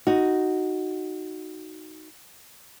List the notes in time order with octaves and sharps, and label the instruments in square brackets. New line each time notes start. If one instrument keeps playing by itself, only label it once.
[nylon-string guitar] D#4 F#4